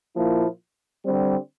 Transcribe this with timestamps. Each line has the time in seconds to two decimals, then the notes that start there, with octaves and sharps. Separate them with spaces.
0.14 A#2 F3 A#3 E4
1.03 D3 G3 C4